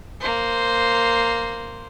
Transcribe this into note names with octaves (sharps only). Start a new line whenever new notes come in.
A#3 C5